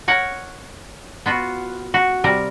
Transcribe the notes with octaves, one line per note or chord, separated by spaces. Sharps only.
A#4 C#5 F#5
B3 F4 F#4
F#4
C3 G3 A#4